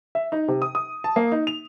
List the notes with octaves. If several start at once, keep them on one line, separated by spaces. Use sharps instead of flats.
E5
D#4
C3
D#6
D#6
A5
A#3
D#4
F7